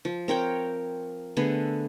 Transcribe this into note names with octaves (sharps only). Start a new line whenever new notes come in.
F3
C4 A#4 C#5 G5
D3 A3 B3 G#4